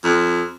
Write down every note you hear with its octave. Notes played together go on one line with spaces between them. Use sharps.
F2